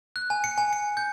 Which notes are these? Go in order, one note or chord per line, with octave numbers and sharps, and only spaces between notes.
F#6
G#5
C#7
G#5
C#7
G6